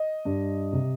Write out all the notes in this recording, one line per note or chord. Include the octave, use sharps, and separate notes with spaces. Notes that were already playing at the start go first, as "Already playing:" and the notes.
Already playing: D#5
G2
C3